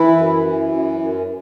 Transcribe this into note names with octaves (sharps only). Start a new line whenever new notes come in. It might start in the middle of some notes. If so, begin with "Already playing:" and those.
Already playing: E3 E4
F#2
E3
F#2
F#2